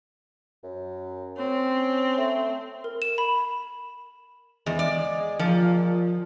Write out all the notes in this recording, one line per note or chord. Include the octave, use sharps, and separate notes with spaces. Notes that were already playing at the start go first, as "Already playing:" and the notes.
F#2
C4 C#4
A3
A#4
E7
B5
E2 G#3
D5
A#2 F3